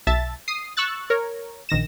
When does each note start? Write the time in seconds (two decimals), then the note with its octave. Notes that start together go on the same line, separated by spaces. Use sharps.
0.07 B1 E5 A5 A6
0.48 D#6 C7
0.77 C#6 E6 F#6 A6
1.10 A#4 C#5
1.69 A#1 D#3 A#6 E7